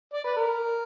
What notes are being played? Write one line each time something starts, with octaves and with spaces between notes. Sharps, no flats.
D5
B4
A#4